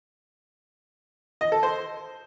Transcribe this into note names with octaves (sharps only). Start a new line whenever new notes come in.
D#5
A4
C5